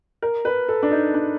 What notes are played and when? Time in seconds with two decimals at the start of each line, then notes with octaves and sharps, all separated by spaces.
0.22 A#4
0.45 B4
0.69 A4
0.83 D4
0.91 D#4
1.14 D4